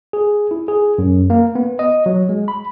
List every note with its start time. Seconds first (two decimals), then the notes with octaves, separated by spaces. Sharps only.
0.13 G#4
0.51 E4
0.68 G#4
0.98 F#2
1.30 A#3
1.55 B3
1.79 D#5
2.06 F#3
2.29 G#3
2.48 B5